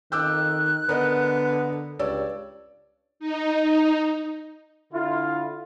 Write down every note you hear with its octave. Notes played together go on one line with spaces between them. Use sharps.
F2 D#3 D6 E6 F#6 G6
D3 B3 A#4 D5 D#5
C#2 G2 C#5 D5 E6
D#4
D3 E4 F4